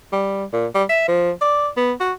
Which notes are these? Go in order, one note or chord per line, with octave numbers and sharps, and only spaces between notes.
G3
A#2
G3
E5
F3
D5
B3
F#4